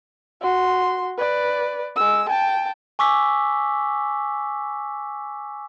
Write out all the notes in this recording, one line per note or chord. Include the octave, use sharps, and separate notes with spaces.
F#4 C6
B4 D5
G#3 E6
G5 A5
G#5 C#6 D6 E6 B6